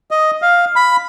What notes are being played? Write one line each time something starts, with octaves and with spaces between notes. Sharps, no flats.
D#5
F5
B5